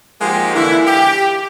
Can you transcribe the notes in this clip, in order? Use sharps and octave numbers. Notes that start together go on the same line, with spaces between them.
F3 G#3 A#3 D#4 F#4 G4
D3 E3 A#3 E4
G4